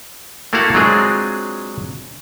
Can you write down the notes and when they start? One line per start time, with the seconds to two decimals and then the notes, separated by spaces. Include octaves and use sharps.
0.53 A3 A#3 E4 F#4 F5 F#5
0.75 F#3 G#3 C4 D4 F4 G#4